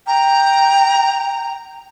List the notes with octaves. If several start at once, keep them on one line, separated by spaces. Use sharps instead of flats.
G5 A#5